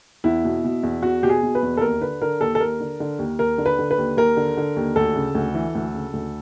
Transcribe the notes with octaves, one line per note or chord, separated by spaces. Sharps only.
E2 E4
B2
B2
E2
E2 F#4
B2 G4
G#4
B2
B4
E2
A4
D#2 A#4
D3 B4
D3 A#4
D#2 A4
A4
D#2 A#4
D3
D3
D#2
D#2 A#4
D3
B4
D3
B4
D#2
D#2 A#4
D3
D3
D#2
D2 A4
C#3
D2
E3
D2
C#3
D2